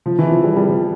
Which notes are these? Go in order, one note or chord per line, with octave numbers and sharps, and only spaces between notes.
F3
E3
F3
G3
G3
F3